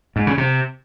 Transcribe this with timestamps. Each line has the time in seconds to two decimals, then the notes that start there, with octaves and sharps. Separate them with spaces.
0.16 G#2
0.27 C#3
0.38 C3